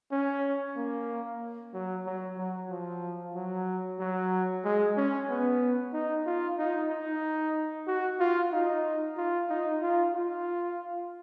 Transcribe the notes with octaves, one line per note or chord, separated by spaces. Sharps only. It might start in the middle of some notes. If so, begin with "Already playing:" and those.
C#4
A#3
F#3
F#3
F#3
F3
F#3
F#3
G#3
C#4
B3
D#4
F4
D#4
D#4
F#4
F4
D#4
F4
D#4
F4
F4